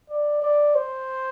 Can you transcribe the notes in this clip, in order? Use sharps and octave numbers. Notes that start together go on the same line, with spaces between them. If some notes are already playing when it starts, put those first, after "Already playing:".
D5
D5
C5